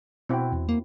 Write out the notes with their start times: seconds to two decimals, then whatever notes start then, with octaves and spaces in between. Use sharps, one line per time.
0.29 B2 C4 E4 F#4 G5
0.52 E2
0.69 A#3